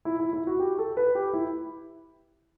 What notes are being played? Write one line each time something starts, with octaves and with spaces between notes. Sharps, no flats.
E4
E4
E4
F#4
G4
A4
B4
G4
E4